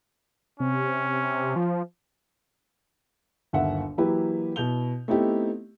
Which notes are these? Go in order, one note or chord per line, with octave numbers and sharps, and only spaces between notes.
C3 C#4
F3
G1 D#2 E5 F#5
E3 F#3 A#3 E4 G4 B4
B2 E4 G6 F7 G7
A3 B3 C4 D#4 E4 G4